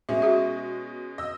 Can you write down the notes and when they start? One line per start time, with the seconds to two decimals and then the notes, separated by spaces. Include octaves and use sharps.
0.09 B2 G#3 C#4 E5
0.22 F#4 G#4 E5
1.18 D#5 E6